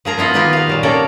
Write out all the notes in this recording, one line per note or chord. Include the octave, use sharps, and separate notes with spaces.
F3 G#4 A#4 A#5
B3 E4 F4 D#5 F#5
D#3 B3 F4 G4 A#4 B4
A#4 F5
A#2 F#3 G3
C3 A#3 C#4 A4 D5 A#5